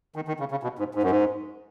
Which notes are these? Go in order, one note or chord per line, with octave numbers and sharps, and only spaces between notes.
D#3
D#3
C#3
C#3
B2
G#2
G#2
F#2
G#2